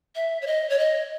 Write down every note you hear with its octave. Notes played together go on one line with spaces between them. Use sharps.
E5
C#5
D#5
C#5
D#5